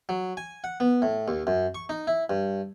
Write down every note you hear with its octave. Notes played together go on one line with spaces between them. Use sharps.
F#3
G#5
F#5
B3
A2
D#2
F#2
C#6
D#4
E4
G2